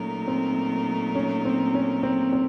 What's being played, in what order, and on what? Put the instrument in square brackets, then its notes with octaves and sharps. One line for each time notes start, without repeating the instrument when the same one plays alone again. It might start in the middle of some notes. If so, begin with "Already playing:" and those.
Already playing: [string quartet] A#2 F#3 A3 D#4 A#4 [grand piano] C#4
[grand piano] C4
C#4
C4
C#4
C4
C4